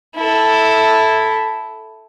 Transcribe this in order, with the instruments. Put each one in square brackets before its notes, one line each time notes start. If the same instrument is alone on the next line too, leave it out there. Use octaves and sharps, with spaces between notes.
[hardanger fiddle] E4 A4